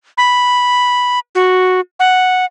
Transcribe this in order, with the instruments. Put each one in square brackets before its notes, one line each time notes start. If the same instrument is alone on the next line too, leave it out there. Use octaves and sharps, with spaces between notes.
[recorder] B5
F#4
F#5